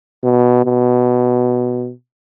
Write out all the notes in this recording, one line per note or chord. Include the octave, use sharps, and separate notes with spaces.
B2
B2